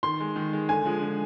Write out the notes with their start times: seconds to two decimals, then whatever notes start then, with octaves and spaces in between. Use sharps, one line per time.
0.03 D#3 C6
0.20 G#3
0.36 D#3
0.53 G#3
0.69 D3 G#5
0.85 F3 G#3
1.01 D3